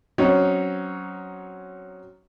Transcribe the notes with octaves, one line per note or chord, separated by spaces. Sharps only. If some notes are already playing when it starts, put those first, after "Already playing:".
F#3 C4 C#4 D#4